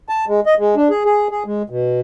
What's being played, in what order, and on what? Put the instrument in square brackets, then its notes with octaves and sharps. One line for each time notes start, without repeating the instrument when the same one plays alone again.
[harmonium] A5
G#3
D#5
G#3
D4
G#4
G#4
G#4
G#3
B2